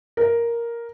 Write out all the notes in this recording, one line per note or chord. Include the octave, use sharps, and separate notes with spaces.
A#4